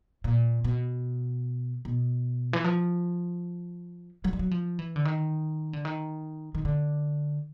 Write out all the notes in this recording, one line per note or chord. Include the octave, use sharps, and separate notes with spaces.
A#2
B2
B2
E3
F3
F#3
G3
F#3
F3
E3
D3
D#3
D3
D#3
D#3
D3